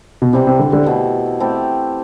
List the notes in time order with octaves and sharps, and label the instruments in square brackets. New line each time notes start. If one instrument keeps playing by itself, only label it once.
[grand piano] B2
[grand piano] C3 [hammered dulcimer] E3 G3 C4
[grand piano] C3
D3
D3
[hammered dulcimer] B2 A3 E4
A3 C4 E4 G4